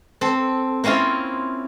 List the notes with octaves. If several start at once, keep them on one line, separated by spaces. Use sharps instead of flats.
C4 A4
A#3 C4 C#4 E4 F4